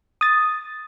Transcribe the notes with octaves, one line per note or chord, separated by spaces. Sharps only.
D#6 A6